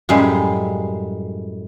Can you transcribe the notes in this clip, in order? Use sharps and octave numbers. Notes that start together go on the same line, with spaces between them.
F#2 A2 G3 G#3 F5